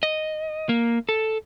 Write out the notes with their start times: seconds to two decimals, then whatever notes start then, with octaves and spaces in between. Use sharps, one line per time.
0.03 D#5
0.69 A#3
1.09 A4